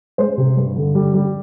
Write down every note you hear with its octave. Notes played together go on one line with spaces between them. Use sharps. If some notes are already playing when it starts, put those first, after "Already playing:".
G#3 C5
C3
G2
D3
G3
G3